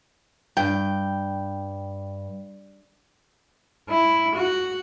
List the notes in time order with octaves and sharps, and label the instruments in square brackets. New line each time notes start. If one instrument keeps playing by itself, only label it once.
[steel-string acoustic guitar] G2 [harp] G5
[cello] E4
F#4